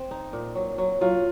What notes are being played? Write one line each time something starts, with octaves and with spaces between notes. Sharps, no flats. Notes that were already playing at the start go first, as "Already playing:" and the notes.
Already playing: C4
D#4
A#2
F#3
F#3
F#3 F4